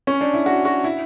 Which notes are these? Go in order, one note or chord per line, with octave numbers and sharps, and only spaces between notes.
C#4
D4
E4
F#4
F#4
E4